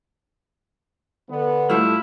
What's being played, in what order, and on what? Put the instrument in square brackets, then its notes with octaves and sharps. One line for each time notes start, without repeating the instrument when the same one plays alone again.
[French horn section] D3 B3
[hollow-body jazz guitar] A2 G3 A3 [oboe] E4 [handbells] F4 B5 F6